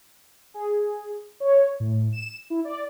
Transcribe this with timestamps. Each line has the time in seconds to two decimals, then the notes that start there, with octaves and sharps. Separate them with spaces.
0.54 G#4
1.40 C#5
1.80 A2
2.13 E7
2.50 E4
2.65 D5